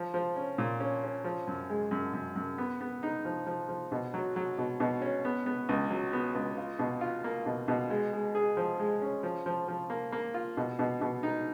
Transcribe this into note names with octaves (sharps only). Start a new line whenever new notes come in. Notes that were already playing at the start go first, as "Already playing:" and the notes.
Already playing: F3
F3
C#4
A#2
C#4
C#4
F3
F#2
G#3
F#2
F#2
F#2
B3
B3
D#4
F3
F3
F3
B2
F#3
F#3
B2
B2
C#4
B3
B3
C#2
F#3
B3
C#2
F4
B2
F4
A#3
B2
B2
G#3
G#3
G#4
F3
G#3
C#4
F3
F3
F3
A#3
A#3
F4
B2
B2
B2
D#4